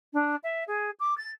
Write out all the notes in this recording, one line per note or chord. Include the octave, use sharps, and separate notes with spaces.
D4
E5
G#4
D6
A6